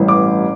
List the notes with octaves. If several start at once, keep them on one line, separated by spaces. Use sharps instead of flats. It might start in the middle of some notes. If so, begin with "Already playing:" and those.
Already playing: A1 G2 E3
D6